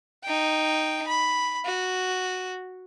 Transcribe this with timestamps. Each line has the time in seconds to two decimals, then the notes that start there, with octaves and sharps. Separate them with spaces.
0.24 D#4 G5
1.07 B5
1.65 F#4